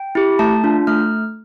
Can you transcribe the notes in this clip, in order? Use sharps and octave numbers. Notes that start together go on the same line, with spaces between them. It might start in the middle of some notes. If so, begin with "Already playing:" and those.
Already playing: G5
E4 G4
A3 A5
D4 F4
A3 F6